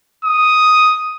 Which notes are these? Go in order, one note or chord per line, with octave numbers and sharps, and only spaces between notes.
D#6